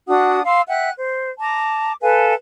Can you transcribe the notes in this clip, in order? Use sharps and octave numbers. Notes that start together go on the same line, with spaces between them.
D4 F#4 F#5 D#6
F5 C6 E6
E5 F#5 G5 F#6
C5
A5 A#5 D6
A4 B4 F5 G#5